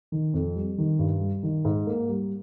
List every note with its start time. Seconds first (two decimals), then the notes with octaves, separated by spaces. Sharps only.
0.12 D#3
0.34 F2
0.55 G3
0.78 D#3
0.99 G2
1.21 G3
1.43 D#3
1.65 G#2
1.87 A#3
2.09 G3